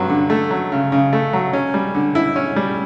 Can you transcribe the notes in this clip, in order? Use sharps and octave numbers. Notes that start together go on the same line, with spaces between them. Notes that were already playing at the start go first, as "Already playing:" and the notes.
Already playing: G2 F#3
D3
A3
F#3
C#3
C#3
A3
F#3
C#4
G3
D3
E4
C#4
G3